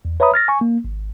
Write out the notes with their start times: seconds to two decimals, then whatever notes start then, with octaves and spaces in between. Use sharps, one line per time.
0.05 E2
0.20 B4 C#5 E5 A#5 B5 D#6
0.34 F6 A6 A#6
0.48 G#5 C#6
0.61 A#3
0.84 G#1